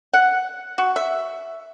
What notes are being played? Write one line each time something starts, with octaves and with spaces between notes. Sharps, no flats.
F#5
F#4
E5